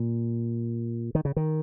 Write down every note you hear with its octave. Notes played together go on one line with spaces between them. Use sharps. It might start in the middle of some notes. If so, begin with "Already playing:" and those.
Already playing: A#2
D#3
C#3
D#3